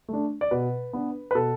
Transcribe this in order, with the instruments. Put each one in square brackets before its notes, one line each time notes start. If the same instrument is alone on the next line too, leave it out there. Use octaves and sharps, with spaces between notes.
[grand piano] A3 D4
D5
B2 B4
B3 D4
B4
B2 A4